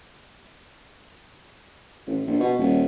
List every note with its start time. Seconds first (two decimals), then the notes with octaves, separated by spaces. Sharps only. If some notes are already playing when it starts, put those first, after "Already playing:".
2.07 A1
2.27 A#1
2.40 B2
2.59 D#1